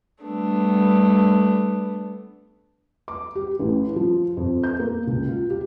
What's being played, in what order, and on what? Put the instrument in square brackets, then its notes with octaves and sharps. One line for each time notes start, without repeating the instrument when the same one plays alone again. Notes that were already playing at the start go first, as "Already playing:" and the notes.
[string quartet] G3 A3 B3 D4
[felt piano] D6
G4
A1
F3
F2
G6
A#3
C#2
F4
G4